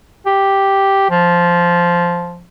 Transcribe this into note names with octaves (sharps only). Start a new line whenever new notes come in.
G4
F3